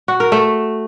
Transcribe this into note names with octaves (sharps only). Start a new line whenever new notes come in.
F#4
A#4
A3